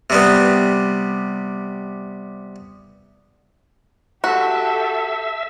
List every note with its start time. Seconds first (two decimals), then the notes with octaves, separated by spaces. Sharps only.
0.10 C3 G3 B3
4.24 F#4 G4 A4 E5